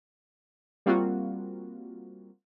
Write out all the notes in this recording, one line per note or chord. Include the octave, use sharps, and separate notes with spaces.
G3 A#3 C4 F4 F#4